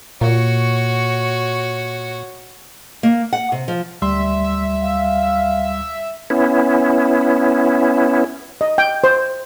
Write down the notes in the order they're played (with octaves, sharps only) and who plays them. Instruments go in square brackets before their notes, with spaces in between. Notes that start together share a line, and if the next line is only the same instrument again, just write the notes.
[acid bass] A#2 [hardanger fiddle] F#4 C#5
[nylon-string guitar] A#3
F#5
C3
F3
[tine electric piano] D2 G3 C6 [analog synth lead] E5
[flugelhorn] F5
[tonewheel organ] B3 C#4 E4
[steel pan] D#5
G5
C5